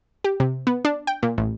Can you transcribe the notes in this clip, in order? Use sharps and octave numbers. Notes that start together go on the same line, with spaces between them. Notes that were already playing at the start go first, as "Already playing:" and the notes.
G4
C3
B3
D4
G5
A#2
A1